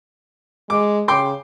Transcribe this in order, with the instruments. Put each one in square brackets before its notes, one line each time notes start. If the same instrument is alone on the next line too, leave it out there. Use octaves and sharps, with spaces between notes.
[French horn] G#3 [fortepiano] D6
[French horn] C#3 [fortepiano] G5 C6 D6